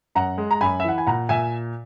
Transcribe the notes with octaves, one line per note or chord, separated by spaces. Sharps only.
F#2 F#5 A#5
G#3
A#5
F#2 G#5 B5
E5
E3 F#5
G#5
A#2 F#5 A#5
A#2 E5 G#5